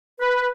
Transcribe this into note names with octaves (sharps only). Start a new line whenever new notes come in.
B4